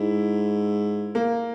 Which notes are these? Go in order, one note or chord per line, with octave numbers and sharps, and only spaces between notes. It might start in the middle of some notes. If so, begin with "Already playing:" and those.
Already playing: G#2 E4
A#3